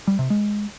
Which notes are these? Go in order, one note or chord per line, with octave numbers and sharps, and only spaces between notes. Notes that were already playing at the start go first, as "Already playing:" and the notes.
G3
C3
G#3